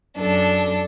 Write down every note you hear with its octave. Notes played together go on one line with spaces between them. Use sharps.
F#2 D4 A4